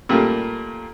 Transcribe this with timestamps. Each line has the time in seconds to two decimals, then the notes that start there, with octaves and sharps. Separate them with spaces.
0.09 A#2 G3 A3 A#3